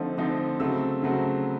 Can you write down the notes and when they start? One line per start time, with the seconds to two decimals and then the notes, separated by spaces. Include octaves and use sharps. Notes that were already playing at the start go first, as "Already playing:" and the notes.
Already playing: D3 F3 A3 C4 D#4
0.18 D3 F3 A3 C4 D#4
0.60 C#3 F#3 A3 C4 E6
1.03 C#3 F#3 A3 C4